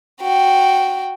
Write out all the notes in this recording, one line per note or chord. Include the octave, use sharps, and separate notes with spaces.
F#4 G5